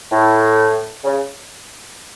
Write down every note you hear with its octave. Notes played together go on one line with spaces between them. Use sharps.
A2
C#3